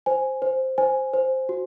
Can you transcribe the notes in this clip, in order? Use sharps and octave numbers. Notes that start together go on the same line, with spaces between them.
C5 G#5
C5
C5 G#5
C5
F#4